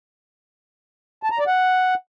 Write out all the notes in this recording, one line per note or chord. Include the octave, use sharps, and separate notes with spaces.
A5
A#5
D5
F#5